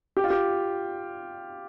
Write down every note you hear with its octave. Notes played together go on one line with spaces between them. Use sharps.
G4
F4
G4